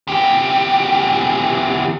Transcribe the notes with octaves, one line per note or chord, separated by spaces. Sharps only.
E2 G4